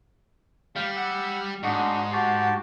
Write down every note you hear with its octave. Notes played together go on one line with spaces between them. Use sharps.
G3 F5 G5
F#5 E6
G#2 D4 D#4 F#4
F#4 G4 A5